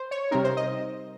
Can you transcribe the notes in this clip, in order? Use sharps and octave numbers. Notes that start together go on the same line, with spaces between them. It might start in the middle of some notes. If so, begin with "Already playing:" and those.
Already playing: C5
C#5
C3 G3 C4 D#4 A#4
C5
D#5